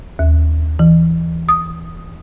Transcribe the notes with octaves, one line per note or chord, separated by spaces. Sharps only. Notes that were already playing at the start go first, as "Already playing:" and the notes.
D#2
E3
D#6